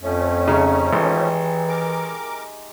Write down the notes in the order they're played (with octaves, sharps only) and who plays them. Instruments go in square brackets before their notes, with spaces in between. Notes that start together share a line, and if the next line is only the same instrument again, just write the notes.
[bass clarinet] F2 [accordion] F3 A3 C#4
[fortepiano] C#3 [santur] D#4 E5 C#6
[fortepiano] G#1 [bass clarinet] E3 [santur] G#3 G4
[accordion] A#4 D6